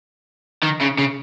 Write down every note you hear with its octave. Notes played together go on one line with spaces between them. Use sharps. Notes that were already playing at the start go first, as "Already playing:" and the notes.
D#3
C#3
C#3